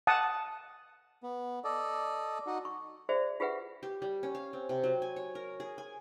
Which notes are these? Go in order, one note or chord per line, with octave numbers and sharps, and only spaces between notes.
F#5 A5 D#6
B3
A4 D5 D#5
D#4 F#4
C#6
F#4 G#4 C5 D5 E5
F4 G4 G#4 B4 E5 F#5
G4
G3
C#4
F5
C4
C3
F#3
G#5
C#5
A#4
G#4
G#5